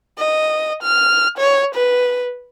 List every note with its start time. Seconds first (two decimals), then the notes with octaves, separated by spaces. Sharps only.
0.18 D#5
0.83 F6
1.38 C#5
1.75 B4